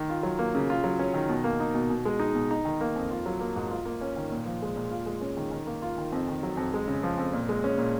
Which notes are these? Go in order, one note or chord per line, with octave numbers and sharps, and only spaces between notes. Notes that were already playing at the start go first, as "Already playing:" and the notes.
Already playing: D#3
F4
F#3
A#3
C#3
F4
F#3
C#4
D#3
B2
A#3
D#4
B2
B2
G#3
D#4
B2
D#4
D#3
A#3
F2
F4
F#3
A#3
G#2
F4
A#3
C#4
D#3
A#2
F3
G#3
A#2
F4
G#3
C#4
D#3
D#3
A#3
F4
D#3
F2
D#3
F#3
F2
G#3
C#3
F3
F2
A#2
G#3
C#4
A#2